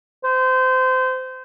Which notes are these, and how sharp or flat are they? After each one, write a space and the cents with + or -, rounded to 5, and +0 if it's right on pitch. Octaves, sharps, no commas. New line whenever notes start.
C5 -25